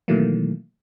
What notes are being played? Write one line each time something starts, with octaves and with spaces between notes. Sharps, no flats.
B2 D#3 E3 F#3 A3 A#3